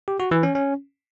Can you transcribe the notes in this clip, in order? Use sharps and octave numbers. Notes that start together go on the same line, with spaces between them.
G4
F#4
E3
C#4
C#4